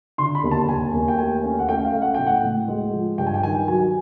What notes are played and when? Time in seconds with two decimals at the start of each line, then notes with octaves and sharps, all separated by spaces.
0.18 D3 C6
0.35 B5
0.44 D#2
0.51 A5
0.68 D#2 G#5
0.94 D#2
1.08 G5
1.18 A3 G#5
1.43 C#4
1.59 F#5
1.69 A3 G5
1.85 F5
1.94 A3
2.02 F#5
2.14 A2 G5
2.26 F#5
2.43 A2
2.68 G#3
2.93 F3
3.18 G2 G5
3.27 G#5
3.34 G5
3.43 D#3 G#5
3.68 F#3 G#5